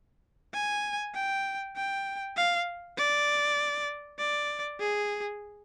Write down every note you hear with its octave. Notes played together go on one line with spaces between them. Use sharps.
G#5
G5
G5
F5
D5
D5
G#4